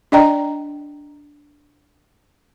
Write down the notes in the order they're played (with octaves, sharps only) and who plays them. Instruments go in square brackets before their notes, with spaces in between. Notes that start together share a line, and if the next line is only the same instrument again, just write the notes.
[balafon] D4 D5 D#5 G5 A#5